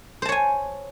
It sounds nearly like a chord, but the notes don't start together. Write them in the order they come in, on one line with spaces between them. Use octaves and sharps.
C5 A5 C#5 G#5